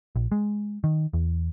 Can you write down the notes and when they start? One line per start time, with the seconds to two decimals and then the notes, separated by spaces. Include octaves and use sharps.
0.16 A#1
0.32 G#3
0.84 D#3
1.13 E2